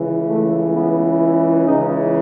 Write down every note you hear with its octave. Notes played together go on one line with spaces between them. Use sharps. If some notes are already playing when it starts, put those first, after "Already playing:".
Already playing: C#2 C#3 E3
A3
B3
E4
C#2 C#3 E3 D#4